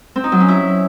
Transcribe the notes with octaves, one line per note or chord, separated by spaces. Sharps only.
C4
D#4
F#3
C#4
E4